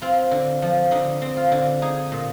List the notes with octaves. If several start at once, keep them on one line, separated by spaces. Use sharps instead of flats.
C4 F4
D3
F3
D3 D#4
C4
F4
D3
D#4 G#4
A#2